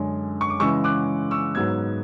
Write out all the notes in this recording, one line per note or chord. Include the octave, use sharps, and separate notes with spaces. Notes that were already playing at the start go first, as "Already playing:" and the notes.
Already playing: F#2 D3 G#3
C#6
D6
C#3 E3 G#3 C#6 E6
D6 F#6
C#6 E6
G#2 F#3 B3 E6 G#6